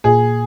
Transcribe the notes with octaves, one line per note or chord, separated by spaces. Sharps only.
A#2 G#4